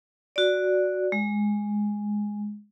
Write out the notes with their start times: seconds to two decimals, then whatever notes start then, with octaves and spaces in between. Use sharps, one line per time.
0.36 F#4 D5
1.12 G#3